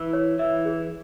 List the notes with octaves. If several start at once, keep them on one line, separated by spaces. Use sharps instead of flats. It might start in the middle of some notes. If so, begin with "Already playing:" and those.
Already playing: E3 E4
C#5
E3 E4 E5
G#4